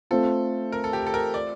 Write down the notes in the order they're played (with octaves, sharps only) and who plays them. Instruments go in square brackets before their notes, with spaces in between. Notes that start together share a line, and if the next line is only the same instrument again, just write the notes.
[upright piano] A3 C4 F4 C5 [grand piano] A4
[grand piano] A#4
A4
G4
A4
A#4
D5